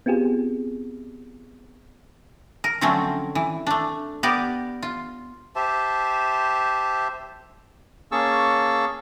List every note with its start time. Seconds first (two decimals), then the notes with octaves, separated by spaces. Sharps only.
0.06 B3 C4 F4 G4 G#4
2.64 A#4
2.81 D3 F3 F#3 A3 C4 C#4
3.35 E3
3.67 A3 D4
4.23 B3 G4 A#4 D5
4.83 F4
5.56 G4 C5 E5 A5
8.12 A#3 C#4 G#4 A5 C#6 E6